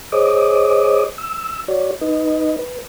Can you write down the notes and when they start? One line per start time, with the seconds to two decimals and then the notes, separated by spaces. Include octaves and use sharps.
0.12 G#4 C5 C#5 D#5 D6 D#6
1.18 E6
1.68 F#4 C#5 D5
2.01 D#4 B4 D#5
2.59 B4